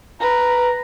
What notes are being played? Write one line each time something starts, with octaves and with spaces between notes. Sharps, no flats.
B4 A#5